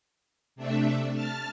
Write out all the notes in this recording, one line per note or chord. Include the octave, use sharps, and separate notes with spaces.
C3 A3 D4 E5
A5 F6 A6